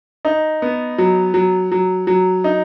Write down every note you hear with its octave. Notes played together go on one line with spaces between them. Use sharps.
D#4
B3
F#3
F#3
F#3
F#3
D#4